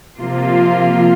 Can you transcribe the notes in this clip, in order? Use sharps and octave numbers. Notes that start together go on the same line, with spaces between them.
C3 F3 A#3 F4